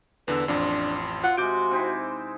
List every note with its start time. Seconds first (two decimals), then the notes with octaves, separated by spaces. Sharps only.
0.28 E2 D3 B4 E6
0.48 A1 F2 F3 D4
1.24 F4 F#5
1.37 C3 G#3 F#4 D6 G6 D7
1.71 C4 D#4 E4